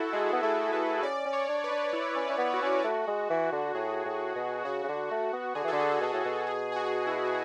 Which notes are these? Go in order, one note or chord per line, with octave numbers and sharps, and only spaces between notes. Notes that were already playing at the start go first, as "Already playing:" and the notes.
Already playing: E4 F#4 A4
G#3 G#4
B3
A3 A4
A3 B4
C#4 D5
C#4
C#5
D4
B4
D4
E4
C#4
C#4
B3
F#4
C#4
A3
G#3
E3
D3
A2 G#4
A2
B2
C#3 F#4
C#3
D3
A3
B3
D3 G#4
E3
D3 A4
G#4
A4
B2 G#4
A2
B2
G#4
G#4
F#4
E4
F#4